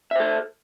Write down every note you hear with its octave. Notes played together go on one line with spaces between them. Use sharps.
A4 C5 E5